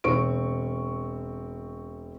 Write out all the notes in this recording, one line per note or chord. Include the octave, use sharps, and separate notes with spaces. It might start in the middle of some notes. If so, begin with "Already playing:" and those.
E1 C4 C#6 D7